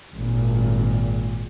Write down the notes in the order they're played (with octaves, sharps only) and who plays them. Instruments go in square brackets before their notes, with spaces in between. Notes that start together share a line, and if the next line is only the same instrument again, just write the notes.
[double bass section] G#1 A#2